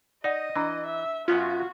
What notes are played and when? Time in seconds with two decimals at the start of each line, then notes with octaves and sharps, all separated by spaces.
0.24 D#4 D5 D#5 F#5
0.56 E3 D4 A#5
0.86 E5
1.28 F#2 B3 C#4 F4 F#4